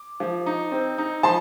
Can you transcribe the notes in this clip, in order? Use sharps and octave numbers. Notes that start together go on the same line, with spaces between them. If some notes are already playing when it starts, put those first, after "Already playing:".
Already playing: D6
F3
D#4
C4
D#4
F3 A5 C6